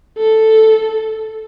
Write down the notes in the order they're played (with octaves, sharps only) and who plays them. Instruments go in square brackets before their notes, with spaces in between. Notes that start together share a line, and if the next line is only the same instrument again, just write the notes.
[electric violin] A4